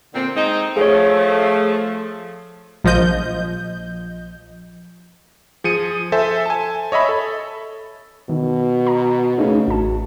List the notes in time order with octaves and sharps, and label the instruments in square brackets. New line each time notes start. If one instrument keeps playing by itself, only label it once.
[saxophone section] A#2 D3 C4
G#3 C4 D#4
[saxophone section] F3 A3 [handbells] G#4 C#5
[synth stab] A#1 F3 D#5 G6
[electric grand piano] F3 G#4 C#7 D#7
A4 C5 E5 G#5
G#5 A5
C#5 D#5 E5 B5
A4
[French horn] B2 [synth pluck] D#3
[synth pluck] A#5
[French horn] C#3 [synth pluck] A3 D4 D#4
[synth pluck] A1 A5 [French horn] F#4